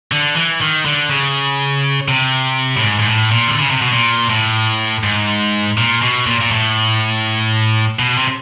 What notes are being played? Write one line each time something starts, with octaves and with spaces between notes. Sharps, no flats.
D3
E3
D#3
D3
C#3
C3
A2
G#2
G#2
A2
A#2
D3
C#3
C3
B2
A#2
A2
G#2
A#2
B2
A#2
A#2
A2
B2
C3